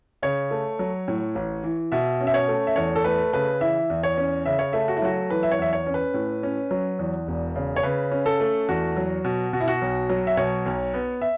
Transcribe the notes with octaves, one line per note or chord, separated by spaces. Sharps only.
C#3 C#5
A3
F#3
A2
A1
E3
B2 E5
C#4
E5
C#5
A3
E5
E2 C#5
A4
A3 B4
C#3 B4
E3 E5
E2
C#5
C#4
C#3 E5
C#5
A3 E5
F#4
E4
F#3 F#4
E3 B4
E5
C#5
E2 E5
C#5
C#4
B4
A2
C#4
F#3
E2
E1
C#3
C#5
C#3 B4
C#4
A4
A3
E2 F#4
F#3
B2
B2 F#4
E4
F#4
B1
F#3
E5
B2 C#5
B1
B3
E5